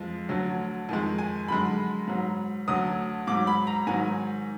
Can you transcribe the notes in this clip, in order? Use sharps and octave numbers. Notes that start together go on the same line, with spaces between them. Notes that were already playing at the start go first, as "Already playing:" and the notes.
Already playing: F2 F3 G#3
D2 D3 F#3
F2 D#3 G#3
G#5
F#2 D3 G#3 B5
G#2 F#3
D2 D3 F#3 D#6
G#2 F#3 D6
B5
A#5
G#2 D#3 F#3 G#5